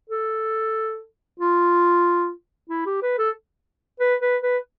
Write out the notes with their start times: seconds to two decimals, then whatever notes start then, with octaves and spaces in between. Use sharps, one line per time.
0.10 A4
1.40 F4
2.70 E4
2.86 G4
3.02 B4
3.19 A4
4.00 B4
4.22 B4
4.43 B4